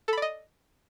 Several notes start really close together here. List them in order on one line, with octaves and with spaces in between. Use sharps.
A4 B5 D5 D#5